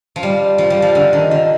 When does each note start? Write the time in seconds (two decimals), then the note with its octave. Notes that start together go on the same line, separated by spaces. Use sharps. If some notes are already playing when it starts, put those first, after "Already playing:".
0.16 F3
0.23 G3
0.58 F3
0.70 G3
0.82 F3
0.95 D3
1.13 D#3
1.31 D3